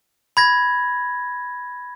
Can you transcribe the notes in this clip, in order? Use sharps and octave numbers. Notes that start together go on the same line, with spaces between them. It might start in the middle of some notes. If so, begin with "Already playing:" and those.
B5 G#6 A#6